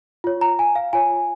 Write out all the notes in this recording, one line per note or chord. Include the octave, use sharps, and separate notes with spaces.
F4 C#5
A#5
G#5
F5
F4 C#5 G#5